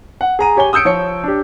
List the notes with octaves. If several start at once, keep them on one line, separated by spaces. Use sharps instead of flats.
F#5
G#4 A#5 D#7
G4 C#5 G#5 G7
D#6 E6 G6 C#7 D7
F3 C#5 C#7
D4 G4